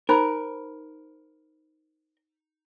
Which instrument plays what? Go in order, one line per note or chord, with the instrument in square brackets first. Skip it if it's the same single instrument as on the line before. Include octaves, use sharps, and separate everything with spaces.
[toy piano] D#4 C5 B5 [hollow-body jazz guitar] A#4